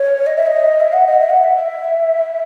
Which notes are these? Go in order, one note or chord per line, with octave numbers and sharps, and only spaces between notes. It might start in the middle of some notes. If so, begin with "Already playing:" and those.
Already playing: C#5
D#5
E5
D#5
E5
F#5
D#5
E5
F#5
F#5
E5